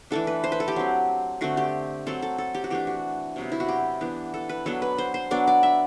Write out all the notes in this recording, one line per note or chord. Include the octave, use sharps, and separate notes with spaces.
E3 A3 D4 A4
B4
C5
B4
A4
G4
F#3 C4
D3 A3 C4 F#4
G4
F#3 C4 A4
A4
A4
G4
F#4
E3 A3 D4 G4
F#4
C3 F#3 B3
E4
F#4
G4
E3 B3 D4
A4
B4
F#3 B3 D4 A4
B4
C5
C5
F#3 B3 D4 D5
D5
E5